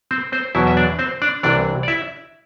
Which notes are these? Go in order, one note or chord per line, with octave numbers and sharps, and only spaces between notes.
C4 C5
C4 C5
E2 B2 F#3 E4 E5
E5
D4 D5
C4 C5
D4 D5
C2 C3 E3 D4 D5
D5
E4 E5